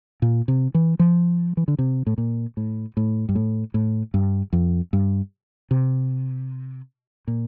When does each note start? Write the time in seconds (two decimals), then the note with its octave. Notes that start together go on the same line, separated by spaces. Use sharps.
0.22 A#2
0.48 C3
0.74 E3
0.99 F3
1.57 E3
1.68 D3
1.79 C3
2.07 A2
2.18 A#2
2.57 A2
2.97 A2
3.29 G2
3.35 A2
3.74 A2
4.14 G2
4.53 F2
4.93 G2
5.71 C3
7.27 A#2